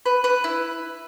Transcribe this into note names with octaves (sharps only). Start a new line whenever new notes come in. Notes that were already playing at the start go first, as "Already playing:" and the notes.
B4
B4
E4